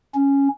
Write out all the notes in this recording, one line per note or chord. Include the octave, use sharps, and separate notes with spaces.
C#4